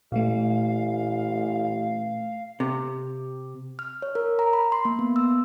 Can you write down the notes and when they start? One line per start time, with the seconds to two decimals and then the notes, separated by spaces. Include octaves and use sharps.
0.12 A1 A#2 A3 F5
2.60 C3
3.79 F6
4.02 C#5
4.15 A#4
4.39 A#5
4.53 B5
4.72 C6
4.85 A#3
4.99 B3
5.16 E6